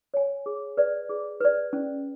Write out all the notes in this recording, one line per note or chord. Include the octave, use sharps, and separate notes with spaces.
C#5 G#5
G#4
B4 D5
G#4
B4 D5
C#4